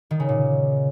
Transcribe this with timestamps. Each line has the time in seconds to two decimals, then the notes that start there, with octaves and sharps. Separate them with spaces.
0.11 D#3
0.20 C#3
0.29 A#2